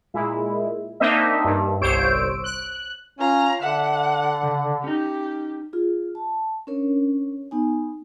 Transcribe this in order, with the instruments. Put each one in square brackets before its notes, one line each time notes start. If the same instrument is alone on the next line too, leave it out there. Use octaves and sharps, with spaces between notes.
[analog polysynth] A#2 G#3 E4
A#3 C4 D4 D#4 D#5 E5
G2
G1 C2 C5 C#5 E6 D7
F#6
[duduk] C#4 [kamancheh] F4 A#5
[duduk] D3 [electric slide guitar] E5 [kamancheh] F#5
[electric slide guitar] C#3
[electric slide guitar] C#4 D#4 [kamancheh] G4
[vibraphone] F4 G#4
A5
C#4 D4 A#4 C#5
B3 D#4 G#5